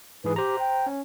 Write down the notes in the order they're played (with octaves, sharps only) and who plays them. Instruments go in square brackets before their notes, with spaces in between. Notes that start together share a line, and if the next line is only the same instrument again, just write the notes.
[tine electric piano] G#2 E3 G#4 [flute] B4
[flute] G4 [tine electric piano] C5 A#5
[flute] G5
[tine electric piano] C#4